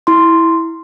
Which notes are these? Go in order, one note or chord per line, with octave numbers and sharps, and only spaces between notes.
E4 C6